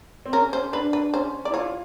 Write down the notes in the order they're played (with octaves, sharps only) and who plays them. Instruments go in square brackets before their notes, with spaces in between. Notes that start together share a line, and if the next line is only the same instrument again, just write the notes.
[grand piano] C4
[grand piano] C#4 [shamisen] A#4
[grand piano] C#4 [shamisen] C5
[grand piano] D4 [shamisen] B4
[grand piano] D4 [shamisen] B4
[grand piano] C#4 [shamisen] C5
[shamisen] D5
[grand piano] E4
[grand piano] F4 [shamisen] C#5